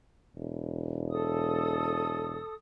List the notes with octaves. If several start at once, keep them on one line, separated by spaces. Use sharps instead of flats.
E1
A4 D#6